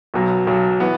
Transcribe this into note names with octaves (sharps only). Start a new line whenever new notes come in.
B1 B2 F#3
B1 B2 F#3
E3 B3